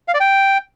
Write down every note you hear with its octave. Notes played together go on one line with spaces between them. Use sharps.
F5
D5
G5